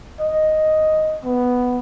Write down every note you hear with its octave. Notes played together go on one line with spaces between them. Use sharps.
D#5
B3